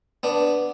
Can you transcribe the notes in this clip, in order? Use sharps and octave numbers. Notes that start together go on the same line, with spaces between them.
B3 D4